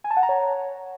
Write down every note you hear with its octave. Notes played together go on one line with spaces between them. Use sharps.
G#5
A5
F#5
A#5
C#5